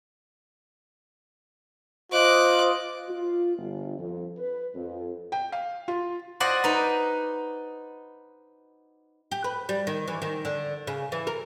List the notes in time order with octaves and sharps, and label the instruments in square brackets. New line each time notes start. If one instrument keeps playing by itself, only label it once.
[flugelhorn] F4 [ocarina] C5 [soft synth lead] D#5 [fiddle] D6 F#6
[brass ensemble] F4
G1
F2
B4
F2
[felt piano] G5
F5
F4
[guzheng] F#4 C5 D5 D#5 F#5
D#4 B4
[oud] G4
B4
G3
D#3
E3
D#3
D3
C#3
E3
A#4